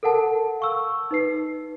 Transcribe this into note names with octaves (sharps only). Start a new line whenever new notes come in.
A4 A#4 F#5 A5
F5 C#6 E6
D#4 B4 C7